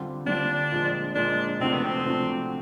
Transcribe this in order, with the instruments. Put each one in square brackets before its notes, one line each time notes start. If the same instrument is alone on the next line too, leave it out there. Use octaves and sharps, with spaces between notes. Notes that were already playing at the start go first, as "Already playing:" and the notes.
Already playing: [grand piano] D3 G3 C4 F4
[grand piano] D3 G3 C4 F4 [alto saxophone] D4
[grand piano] A#2 F3 G#3
[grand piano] A#2 F3 G#3 [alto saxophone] D4
[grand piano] C3 F3 A3 D4 F#4 [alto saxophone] C4
[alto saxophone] B3
C4
[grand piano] C3 F3 A3 D4 F#4